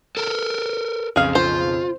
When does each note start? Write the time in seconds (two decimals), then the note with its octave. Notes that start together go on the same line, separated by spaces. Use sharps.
0.17 A4 A#4
1.16 B1 F2 C#3 G#4 F5
1.35 F4 C5